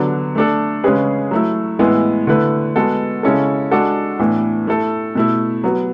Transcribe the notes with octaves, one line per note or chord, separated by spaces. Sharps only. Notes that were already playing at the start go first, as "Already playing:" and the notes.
Already playing: D3 F#3 B3 D4
A3 D4 A4
C#3 G#3 C#4 G#4 B4
F#3 A3 E4
A2 E3 G#3 B3 E4
D3 A3 E4 B4
G#3 B3 F#4 A4
C#3 G#3 C#4 E4 A4
G#3 D4 F#4 A4
A2 E3 B3 D4
A3 E4 A4
B2 A3 E4
F#3 B3 F#4